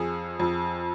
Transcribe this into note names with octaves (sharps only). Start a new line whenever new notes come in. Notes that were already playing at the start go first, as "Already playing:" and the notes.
Already playing: F2 G#4
F2